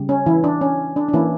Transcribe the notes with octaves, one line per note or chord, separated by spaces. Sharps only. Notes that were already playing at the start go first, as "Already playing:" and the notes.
Already playing: C#3 G3
C#4
E3 E4
D4
C#4
D4
D4
E3 A#3 C#4 E4